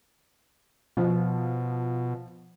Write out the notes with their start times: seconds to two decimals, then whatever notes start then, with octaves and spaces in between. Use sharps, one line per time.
0.97 B2 F3